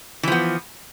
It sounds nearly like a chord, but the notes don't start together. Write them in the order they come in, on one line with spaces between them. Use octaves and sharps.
E3 F3 B3